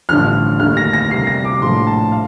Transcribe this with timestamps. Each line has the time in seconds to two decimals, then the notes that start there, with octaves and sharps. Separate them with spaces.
0.09 A1 G2 D3 F3 F6
0.60 D#2 D3 A3 F6
0.77 A#6
0.93 A#6
1.10 C2 C3 G3 A#3 C7
1.27 A#6
1.45 D6
1.61 A#1 A2 F3 A3 C6
1.87 A5
2.12 F5